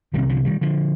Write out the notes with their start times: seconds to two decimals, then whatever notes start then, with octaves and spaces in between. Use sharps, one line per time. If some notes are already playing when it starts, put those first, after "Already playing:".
0.13 C2 C3 D#3 G3
0.29 D3 F3
0.45 D#3 G3
0.61 D3 F3